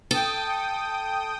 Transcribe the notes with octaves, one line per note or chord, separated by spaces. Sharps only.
A4 G5 D#6